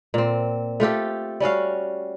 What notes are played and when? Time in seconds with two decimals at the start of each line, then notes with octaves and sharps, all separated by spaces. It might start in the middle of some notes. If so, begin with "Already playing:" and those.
0.14 A#2 C4
0.80 A3 F4 G4 A4
1.40 G3 C#4 F#4 F5